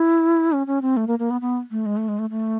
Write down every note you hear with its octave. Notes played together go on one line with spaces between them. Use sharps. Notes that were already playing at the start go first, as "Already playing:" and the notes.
Already playing: E4
C#4
C#4
C4
A3
A#3
A#3
B3
B3
A3
G#3
A3
G#3
A3
A3